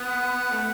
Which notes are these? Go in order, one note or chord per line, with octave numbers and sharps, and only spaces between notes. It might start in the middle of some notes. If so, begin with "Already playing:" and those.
Already playing: B3 F#5
A3